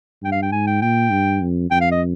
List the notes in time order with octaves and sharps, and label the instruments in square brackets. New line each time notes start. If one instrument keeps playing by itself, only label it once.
[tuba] G2 [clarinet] G5
[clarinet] F5
G5
[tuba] G#2 [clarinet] G#5
[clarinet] G5
[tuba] A#2 [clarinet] G5
[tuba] G2
F2
[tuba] F2 [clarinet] G5
[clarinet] F5
D#5